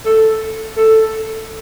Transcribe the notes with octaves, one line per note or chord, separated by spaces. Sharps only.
A4
A4